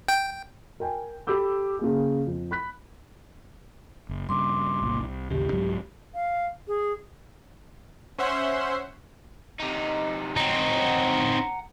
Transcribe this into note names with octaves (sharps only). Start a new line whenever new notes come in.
G5
A#4 G5 G#5
G4 A4 B5 D6 E6 G6
C#3 A#3 G#4
F2
B5 F#6 B6
F#1
G2 C#3 C6 D6
F#1 C2 A#2
C2
A1 D#2 C#3 G4
C2 G#2 F#3
F5
G#4
C#4 C5 E5 F#5 C6
C3 D#4
C4 D#4 F#5 A#5